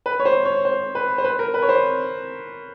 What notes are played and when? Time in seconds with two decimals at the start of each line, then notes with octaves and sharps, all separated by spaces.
0.06 B4
0.20 C#5
0.25 C5
0.45 C#5
0.65 C5
0.95 B4
1.18 C5
1.24 B4
1.39 A#4
1.54 B4
1.62 C#5
1.69 C5